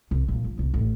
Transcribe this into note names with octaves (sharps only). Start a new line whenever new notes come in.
C2
A#1
F3
C2
A1